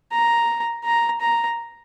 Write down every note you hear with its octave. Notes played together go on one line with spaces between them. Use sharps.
A#5
A#5
A#5